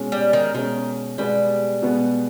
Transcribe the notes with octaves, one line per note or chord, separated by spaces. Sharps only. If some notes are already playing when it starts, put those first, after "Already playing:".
Already playing: B2 G#3 C#4
G3
D#3
B2 D#3 G#3 C#4
B2 G3 G#3 B3
B2 G#3 B3